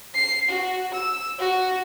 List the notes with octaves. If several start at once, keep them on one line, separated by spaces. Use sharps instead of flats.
C7
F#4
E6
F#4